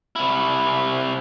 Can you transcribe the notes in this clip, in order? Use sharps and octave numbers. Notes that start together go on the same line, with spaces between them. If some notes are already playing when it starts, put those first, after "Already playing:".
C3 E4